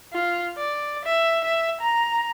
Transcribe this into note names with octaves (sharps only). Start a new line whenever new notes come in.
F4
D5
E5
E5
A#5